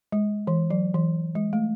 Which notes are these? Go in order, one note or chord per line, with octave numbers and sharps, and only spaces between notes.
G#3
E3
F#3
E3
G#3
A3